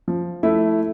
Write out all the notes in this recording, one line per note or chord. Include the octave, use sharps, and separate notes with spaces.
F3
A3 E4